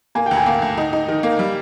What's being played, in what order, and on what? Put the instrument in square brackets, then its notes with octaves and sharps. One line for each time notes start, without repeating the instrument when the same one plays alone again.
[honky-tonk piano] A#3 [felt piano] G#5
[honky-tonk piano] D2 [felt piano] G5
[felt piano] G#5
[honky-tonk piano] A#3
D2
D#4
D#4
D#3
A#3
G3